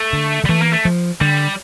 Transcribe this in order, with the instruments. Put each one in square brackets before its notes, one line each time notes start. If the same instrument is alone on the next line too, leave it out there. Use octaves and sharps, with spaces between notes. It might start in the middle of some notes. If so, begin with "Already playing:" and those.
Already playing: [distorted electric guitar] A3
[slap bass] D3
[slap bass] D3 [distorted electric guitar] G3
[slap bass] E3 [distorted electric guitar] A3
[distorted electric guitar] A#3
A3
[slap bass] F3
[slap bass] D3 [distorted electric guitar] G3